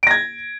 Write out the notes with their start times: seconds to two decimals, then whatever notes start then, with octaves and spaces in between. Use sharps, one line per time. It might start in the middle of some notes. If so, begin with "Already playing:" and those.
0.03 D7
0.07 A#6
0.11 G#6